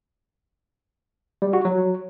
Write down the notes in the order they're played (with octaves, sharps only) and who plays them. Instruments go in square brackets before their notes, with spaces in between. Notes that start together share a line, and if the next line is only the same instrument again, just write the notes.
[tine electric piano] G3
F#4
F#3